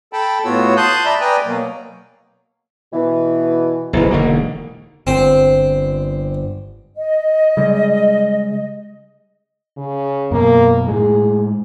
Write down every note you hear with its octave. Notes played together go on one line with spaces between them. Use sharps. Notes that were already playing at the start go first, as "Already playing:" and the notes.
A4 G5 A5 B5
A2 B3 F4 F#4 C#5 E6
A5 C6 D#6 F#6 G6
D5 E5 A#5 B5
B4 D5 G5 G#5 A#5 D#6
B2 F#3 A#3
B2 E3
F#1 B1 G#2 E3
E1 D3 A#3 D#4 F#4
G1 C4
D#5
C#3 G3 G#3
C#3
F#2 B2 A#3
A2 G#3 G#4